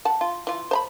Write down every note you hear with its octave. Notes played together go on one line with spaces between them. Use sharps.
F#5 A5
F4
E3 F4
C5 A#5 B5